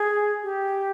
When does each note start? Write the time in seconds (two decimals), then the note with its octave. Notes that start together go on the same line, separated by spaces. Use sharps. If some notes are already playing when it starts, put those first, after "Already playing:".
Already playing: G#4
0.43 G4